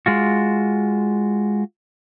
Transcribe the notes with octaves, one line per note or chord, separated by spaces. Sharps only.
G#3 F4 F#4